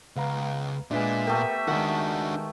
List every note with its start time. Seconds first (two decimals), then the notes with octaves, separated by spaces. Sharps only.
0.16 C#2 B3 F5 A#5
0.91 A#2 G#3 B3 D4 E5
1.27 A3 B3 G4 A#4
1.68 D#3 G#3 D4 F#4